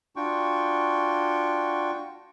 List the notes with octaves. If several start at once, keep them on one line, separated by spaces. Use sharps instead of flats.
D4 F4 F#4 G5 C#6